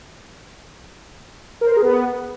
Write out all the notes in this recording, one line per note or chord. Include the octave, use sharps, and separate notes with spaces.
A#4
C5
A#4
G#4
B3